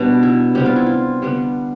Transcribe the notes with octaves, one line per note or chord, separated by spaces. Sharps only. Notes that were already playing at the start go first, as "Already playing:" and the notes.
Already playing: B2 G3 B3 D4
E4
C3 G3 B3 G4
F4
E4
F4
D3 G3 B3